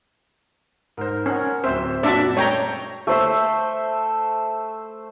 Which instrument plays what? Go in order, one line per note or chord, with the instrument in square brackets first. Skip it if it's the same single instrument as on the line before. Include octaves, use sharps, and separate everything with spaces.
[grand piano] G#2 C5 [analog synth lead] A#4
[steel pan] C#4 [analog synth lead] A#4 [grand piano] C5 F#5 G#5
[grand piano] D1 E5 E6 [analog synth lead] C4 [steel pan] C5
[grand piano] F#2 A#2 [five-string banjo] D4 F#4 [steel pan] D5 E5 A5
[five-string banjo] G#3 [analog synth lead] A3 [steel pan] C#5 G5 A#5
[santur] A3 C5 E5